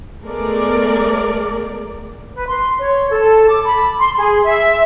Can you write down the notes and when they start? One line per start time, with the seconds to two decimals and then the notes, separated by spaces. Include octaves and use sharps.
0.24 G#3 A3 B3 G#4 A#4 D5
2.35 B4
2.47 C6
2.78 C#5
3.10 A4
3.48 D6
3.65 B5
3.98 C6
4.18 G#4
4.43 E5